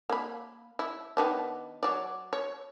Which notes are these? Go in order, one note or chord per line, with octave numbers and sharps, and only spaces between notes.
A#3 B5
E4
D#3 B3 D4
F#3 D5
C#5